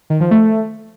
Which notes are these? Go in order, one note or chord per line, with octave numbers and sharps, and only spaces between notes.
D#3
F3
A3